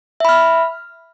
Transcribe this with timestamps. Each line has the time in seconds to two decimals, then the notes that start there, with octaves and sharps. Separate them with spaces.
0.20 E5
0.25 B5
0.29 F6